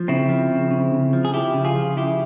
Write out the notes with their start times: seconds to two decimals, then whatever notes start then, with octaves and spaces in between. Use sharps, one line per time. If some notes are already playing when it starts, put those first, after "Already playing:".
Already playing: F3
0.08 C#3 C4 E4
0.29 F3
0.50 C#3
0.71 C#3
0.92 C#3
1.13 F3
1.25 G#4
1.33 F3 E4 G4
1.54 C#3
1.65 F4 G#4
1.76 F3
1.97 C#3 E4 G4